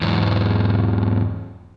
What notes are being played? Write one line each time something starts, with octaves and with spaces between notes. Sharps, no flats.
E2 G#2